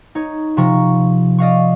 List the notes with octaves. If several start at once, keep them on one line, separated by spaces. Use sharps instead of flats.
D#4 C#5
C3 F3 A#5 C#6
D5 D#5 F5 C#6